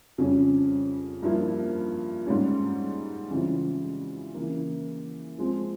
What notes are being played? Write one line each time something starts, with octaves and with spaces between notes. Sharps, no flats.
F2 C#3 G3 C#4
G2 F3 A#3 E4
G#2 G3 C#4
C#3 E3 G3 C4 F4
C#3 E3 A#3
F3 G#3 C4